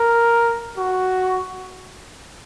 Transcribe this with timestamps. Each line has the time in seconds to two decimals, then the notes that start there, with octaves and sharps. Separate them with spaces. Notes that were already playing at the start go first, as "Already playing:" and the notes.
Already playing: A#4
0.77 F#4